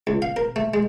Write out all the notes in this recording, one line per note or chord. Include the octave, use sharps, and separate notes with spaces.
C#2
F5
A#4
A3
G#3